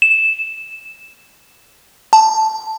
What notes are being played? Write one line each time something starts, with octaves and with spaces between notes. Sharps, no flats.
E7
A5